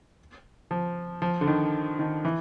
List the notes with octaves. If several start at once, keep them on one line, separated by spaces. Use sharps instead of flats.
F3
F3
D3
D#3
D#3
E3